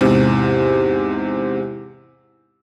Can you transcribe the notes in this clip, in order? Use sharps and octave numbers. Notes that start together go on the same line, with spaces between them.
E2 G#2 C3